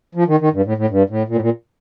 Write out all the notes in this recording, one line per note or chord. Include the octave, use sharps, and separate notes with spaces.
F3
D#3
D#3
G2
A2
A2
G2
A2
A#2
A2
A#2